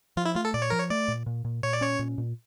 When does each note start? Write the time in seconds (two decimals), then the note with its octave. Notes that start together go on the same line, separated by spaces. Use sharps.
0.17 F3 F4
0.25 E4
0.35 A3 F4
0.45 A4
0.54 A#2 D5
0.62 C#5
0.70 F3 A#4
0.79 C#5
0.90 A3 D5
1.08 A#2
1.26 A#2
1.45 A#2
1.63 A#2 C#5
1.73 D5
1.81 C#4 C#5
1.99 A#2
2.18 A#2